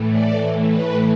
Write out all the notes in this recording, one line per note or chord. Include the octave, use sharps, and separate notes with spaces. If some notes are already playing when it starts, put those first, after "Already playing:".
Already playing: A2 E3 A3
D5
B4